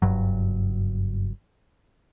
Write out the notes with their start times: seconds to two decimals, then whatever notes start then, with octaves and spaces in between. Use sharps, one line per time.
0.02 F#1 G2 F#3